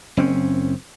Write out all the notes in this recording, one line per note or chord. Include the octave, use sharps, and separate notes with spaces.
F#1 C4 C#4